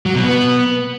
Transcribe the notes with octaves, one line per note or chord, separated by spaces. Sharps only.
F#3
B2
B3